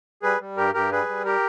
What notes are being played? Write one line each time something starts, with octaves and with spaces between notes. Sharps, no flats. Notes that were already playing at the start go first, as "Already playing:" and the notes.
G3 G#4 B4
G3
G2 G4 A#4
G2 G4 A#4
G3 G#4 B4
G3
G4 A#4